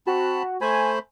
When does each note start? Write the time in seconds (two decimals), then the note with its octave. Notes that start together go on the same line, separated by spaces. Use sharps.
0.07 C4 F#4 A5 B5
0.61 A3 C5 G#5 B5